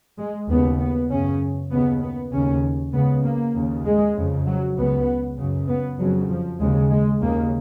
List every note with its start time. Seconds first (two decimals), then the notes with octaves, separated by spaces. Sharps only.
0.18 G#3
0.49 D#2 C#3 B3
0.80 B3
1.10 F#2 C#3 C#4
1.71 D#2 C#3 B3
2.02 B3
2.32 D#2 C#3 C#4
2.93 C#2 C#3 B3
3.24 A#3
3.54 D#2 C#3
3.84 G#3
4.15 F2 C#3
4.46 F#3
4.77 C#2 C#3 B3
5.38 F#2 C#3
5.68 B3
5.99 F2 C#3 F#3
6.30 F3
6.59 D#2 C#3 G#3
6.90 G#3
7.20 D#2 C#3 A#3